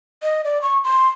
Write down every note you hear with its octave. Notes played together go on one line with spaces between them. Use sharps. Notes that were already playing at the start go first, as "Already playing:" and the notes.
D#5
D5
C#6
C6